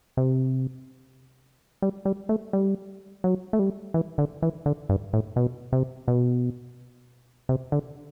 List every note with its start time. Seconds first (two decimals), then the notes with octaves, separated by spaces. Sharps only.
0.17 C3
1.82 G3
2.05 G3
2.29 A3
2.53 G3
3.24 F#3
3.53 A3
3.59 G3
3.94 E3
4.18 D3
4.42 E3
4.66 D3
4.89 G2
5.13 A2
5.36 B2
5.72 C3
6.08 B2
7.49 C3
7.72 D3